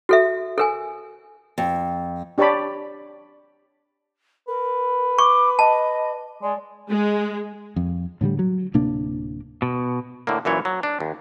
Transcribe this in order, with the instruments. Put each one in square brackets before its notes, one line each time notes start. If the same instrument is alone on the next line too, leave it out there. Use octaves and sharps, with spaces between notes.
[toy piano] F#4 A4 E5
A4 A#4 G#5
[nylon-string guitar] F2
[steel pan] D4 G4 C#5 D5 A5 B5
[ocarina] A#4 [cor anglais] B4
[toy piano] C#6 [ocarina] D6
[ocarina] D#5 [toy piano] A5
[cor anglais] G#3 [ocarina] D5
[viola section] G#3
[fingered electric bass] F2
A2 D3 F3 G3
F#3
D1 C3 A#3 D4
[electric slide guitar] B2
[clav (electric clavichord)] A2 D3 A#3
F#2 A#2 E3 C#5
F#3
D4
D#2